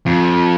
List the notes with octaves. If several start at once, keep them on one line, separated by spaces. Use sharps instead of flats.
F2